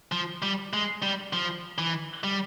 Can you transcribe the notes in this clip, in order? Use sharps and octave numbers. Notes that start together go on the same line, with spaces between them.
F3
G3
G#3
G3
F3
E3
G3